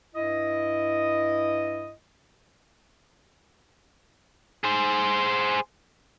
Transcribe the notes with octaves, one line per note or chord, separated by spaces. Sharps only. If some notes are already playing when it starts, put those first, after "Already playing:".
G2 E4 D#5
G#4 C5